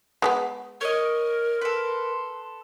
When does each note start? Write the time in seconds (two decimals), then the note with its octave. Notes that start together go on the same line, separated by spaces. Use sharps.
0.22 G#3 A3 B3
0.81 A#4 C#5 D#5
1.61 A4 B4 C6